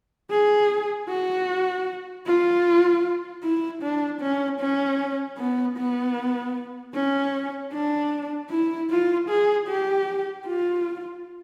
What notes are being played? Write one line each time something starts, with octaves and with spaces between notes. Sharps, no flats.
G#4
F#4
F4
E4
D4
C#4
C#4
B3
B3
C#4
D4
E4
F4
G#4
G4
F4